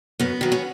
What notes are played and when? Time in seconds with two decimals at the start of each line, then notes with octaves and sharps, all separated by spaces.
0.19 F#2 B3
0.41 D#3 F#3
0.52 C#4